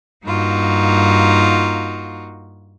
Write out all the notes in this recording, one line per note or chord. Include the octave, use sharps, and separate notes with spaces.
G2 A#3 D#4 F4 F#4